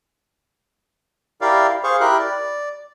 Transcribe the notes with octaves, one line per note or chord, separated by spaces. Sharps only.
E4 G4 A#4 D5 F5
G#4 C5 F5 C#6
E4 G4 A#4 F#6
D5